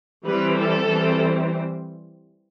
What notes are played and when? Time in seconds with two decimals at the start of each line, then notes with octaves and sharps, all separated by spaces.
0.25 E3 G3 C4 B4
0.58 A4
0.90 E3 G3 C4